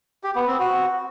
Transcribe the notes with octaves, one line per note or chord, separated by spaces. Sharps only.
G4
B3
C4
F#4